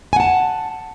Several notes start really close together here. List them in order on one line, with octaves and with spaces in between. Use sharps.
G#5 F#5 A5